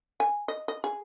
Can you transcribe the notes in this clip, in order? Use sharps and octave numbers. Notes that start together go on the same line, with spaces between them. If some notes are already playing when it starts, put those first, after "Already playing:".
G#5
D#5
D#5
G#4